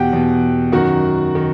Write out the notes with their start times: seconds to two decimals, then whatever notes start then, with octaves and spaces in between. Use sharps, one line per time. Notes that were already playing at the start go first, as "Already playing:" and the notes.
Already playing: E2 B2 G4 F#5 G5
0.13 E2 B2
0.72 F#2 D#3 F#4 F#5
1.35 D#3